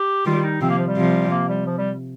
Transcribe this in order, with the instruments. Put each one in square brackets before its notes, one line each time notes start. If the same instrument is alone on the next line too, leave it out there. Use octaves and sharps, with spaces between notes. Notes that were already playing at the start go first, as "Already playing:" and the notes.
Already playing: [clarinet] G4
[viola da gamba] D#3 G3 [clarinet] F4
[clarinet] D#4
[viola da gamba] C3 F3 [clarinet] C4
[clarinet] A#3
F3
G3
[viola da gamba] C3 F3
[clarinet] A#3
G3
F3
G3